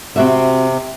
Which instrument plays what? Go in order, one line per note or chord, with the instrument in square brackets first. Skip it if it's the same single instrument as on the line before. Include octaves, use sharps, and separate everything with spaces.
[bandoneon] C3 [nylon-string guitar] C4 F#4 E5